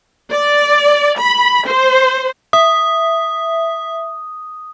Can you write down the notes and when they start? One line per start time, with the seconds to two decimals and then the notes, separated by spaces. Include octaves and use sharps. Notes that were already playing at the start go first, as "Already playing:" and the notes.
0.31 D5
1.19 B5
1.67 C5
2.53 E5 D#6